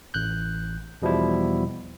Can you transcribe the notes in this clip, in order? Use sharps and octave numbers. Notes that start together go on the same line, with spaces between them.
A1 F#6 G6
E2 B2 F3 G3 E4